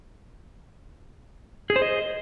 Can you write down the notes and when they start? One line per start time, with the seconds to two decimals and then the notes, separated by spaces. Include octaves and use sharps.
1.70 G#4
1.76 C5
1.82 D#5